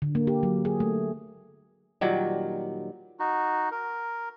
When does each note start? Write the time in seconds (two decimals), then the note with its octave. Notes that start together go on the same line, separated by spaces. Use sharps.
0.02 D3
0.15 A#3
0.27 G4
0.43 F#3
0.65 G#4
0.80 A3
2.01 A#2 D#3 F#3 G3
3.20 D#4 F#4
3.71 A#4